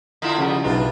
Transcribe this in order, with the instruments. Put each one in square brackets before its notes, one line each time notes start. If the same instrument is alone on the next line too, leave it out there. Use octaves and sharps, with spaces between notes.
[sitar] D3 A#3 E4 [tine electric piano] F4 D#5
[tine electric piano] C#3 [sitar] F3 [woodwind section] G3 F#4 G#4
[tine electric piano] B1 D#4 [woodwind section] G2 C3 [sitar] F4